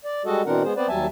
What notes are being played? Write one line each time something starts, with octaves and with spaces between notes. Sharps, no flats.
D5
G3 G#3 F#4 A4 D#5
B2 E3 C4 D4 A#4 F#5
G#3 B3 G#4 C5
B3 C4 B4 C5 D5
D#2 F#3 G3 E5 G#5 A5